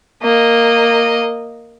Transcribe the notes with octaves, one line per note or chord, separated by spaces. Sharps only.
A#3 D#5